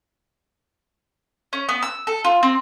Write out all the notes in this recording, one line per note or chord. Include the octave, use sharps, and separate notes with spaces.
C#4
B3
E6
A4
F4
C4